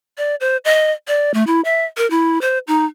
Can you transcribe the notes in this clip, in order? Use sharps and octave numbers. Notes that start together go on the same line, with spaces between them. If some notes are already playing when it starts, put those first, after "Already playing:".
D5
C5
D#5
D5
A3
E4
E5
A#4
E4
C5
D#4